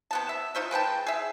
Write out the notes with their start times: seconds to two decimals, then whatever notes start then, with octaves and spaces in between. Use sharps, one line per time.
0.11 C3 B3 A5
0.29 E5
0.55 D#4 F4 C5 E5
0.71 G#3 B4 G5 A5
1.07 G#4 E5